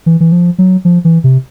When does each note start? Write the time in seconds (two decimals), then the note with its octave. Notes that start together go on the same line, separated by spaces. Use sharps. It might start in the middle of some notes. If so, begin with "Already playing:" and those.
0.06 E3
0.20 E3
0.32 F3
0.58 F#3
0.85 F3
1.05 E3
1.24 C3